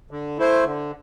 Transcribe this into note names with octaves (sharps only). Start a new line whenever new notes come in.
D3
A3 E4 C5
D3